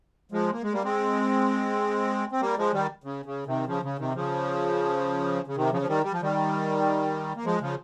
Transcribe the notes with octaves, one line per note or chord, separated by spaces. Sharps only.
F3 G#3
A#3
G#3
G3 A#3
G#3 C4
C4
G3 A#3
F3 G#3
D#3 G3
C#3
C#3
C3 D#3
C#3 F3
C#3
C3 D#3
C#3 F3
C#3
C3 D#3
C#3 F3
F3
D#3 G3
G3
F3
D#3 G3
A#3
F3 G#3
C#3 F3